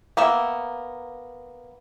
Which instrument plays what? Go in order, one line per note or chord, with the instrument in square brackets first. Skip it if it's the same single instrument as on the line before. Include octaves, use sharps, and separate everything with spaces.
[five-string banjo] A#3 B3 E5